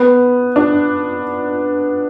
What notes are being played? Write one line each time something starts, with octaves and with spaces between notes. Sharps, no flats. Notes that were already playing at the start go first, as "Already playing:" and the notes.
Already playing: B3
D4